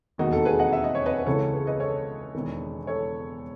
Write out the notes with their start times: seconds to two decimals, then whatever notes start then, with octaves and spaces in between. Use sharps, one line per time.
0.18 E1 D#2 D#3 D#4 F#4
0.33 F#4 A4
0.45 G#4 B4
0.59 D#5 F#5
0.73 E5
0.84 D#5
0.95 C#5
1.06 B4 D#5
1.19 B4
1.26 C#2 C#3 E3 A4 C#5
1.53 G#4 B4
1.67 B4 D#5
1.80 A4 C#5
2.35 E1 E2 D#3
2.87 A4 C#5